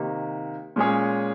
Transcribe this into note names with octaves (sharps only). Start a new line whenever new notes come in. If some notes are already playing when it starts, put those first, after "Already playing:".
Already playing: C3 D#3 A#3 D#4
A#2 G#3 C#4 G#4 C#5